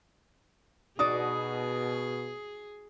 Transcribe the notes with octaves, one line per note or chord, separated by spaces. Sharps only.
B2 D#4 F#4 G#4 D5 D#6